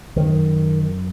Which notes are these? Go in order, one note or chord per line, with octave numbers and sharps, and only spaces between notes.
F#2 D#3